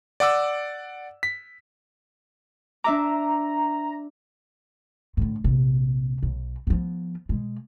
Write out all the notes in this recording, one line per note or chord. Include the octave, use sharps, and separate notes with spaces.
D5 F#5 D6 E6
B6
D4 E5 A#5 D6
A2 D3
A#1 C3
B1
F3 B3
B2 G#3